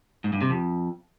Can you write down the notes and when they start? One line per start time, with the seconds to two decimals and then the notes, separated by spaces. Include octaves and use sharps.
0.24 G#2
0.33 G2
0.41 C3
0.50 F2